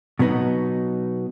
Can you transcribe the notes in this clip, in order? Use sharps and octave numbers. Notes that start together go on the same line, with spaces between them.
B2 F#3 B3 D#4